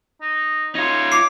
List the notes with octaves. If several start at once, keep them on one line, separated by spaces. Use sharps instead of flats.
D#4
D#4 F4 C#5
D6 C7